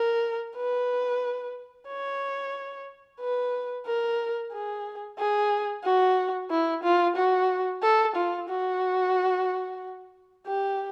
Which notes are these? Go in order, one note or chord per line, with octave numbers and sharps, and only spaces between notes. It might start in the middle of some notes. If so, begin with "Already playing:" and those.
Already playing: A#4
B4
C#5
B4
A#4
G#4
G#4
F#4
E4
F4
F#4
A4
F4
F#4
G4